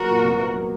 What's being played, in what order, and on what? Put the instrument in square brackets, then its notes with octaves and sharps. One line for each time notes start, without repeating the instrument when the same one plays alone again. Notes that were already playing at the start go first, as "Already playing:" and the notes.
Already playing: [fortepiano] F#3 A#3 [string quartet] F#4 A#4
[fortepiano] A#2
C2
A#3
F#3